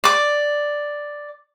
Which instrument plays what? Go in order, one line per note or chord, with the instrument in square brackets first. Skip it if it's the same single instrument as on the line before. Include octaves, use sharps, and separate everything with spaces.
[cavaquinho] D5 D6